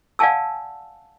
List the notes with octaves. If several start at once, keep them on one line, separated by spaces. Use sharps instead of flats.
D5 F5 F#5 G#5 A5 E6